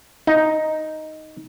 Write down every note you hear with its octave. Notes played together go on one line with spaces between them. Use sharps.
D#4